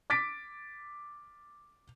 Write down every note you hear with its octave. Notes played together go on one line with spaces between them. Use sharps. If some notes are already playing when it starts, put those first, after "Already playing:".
D6 A6 B6 D7